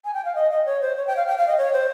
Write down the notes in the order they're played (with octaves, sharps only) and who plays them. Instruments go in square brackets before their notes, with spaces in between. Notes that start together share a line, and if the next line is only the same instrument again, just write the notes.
[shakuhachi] G#5
G5
F5
D#5
D#5
C#5
C5
C#5
G5
F5
G5
F5
D#5
C#5
C5